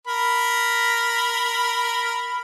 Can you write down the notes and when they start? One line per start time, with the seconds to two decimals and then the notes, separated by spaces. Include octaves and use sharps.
0.07 A#4 B5